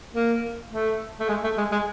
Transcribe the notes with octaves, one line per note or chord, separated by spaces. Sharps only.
A#3
A3
A3
G#3
A3
G#3
G#3